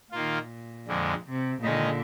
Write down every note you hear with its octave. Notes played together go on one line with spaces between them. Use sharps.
A#2 D#3 A#3 F4
F2 D3 G#3
C3
A#2 D3 D#3 G#3 D#4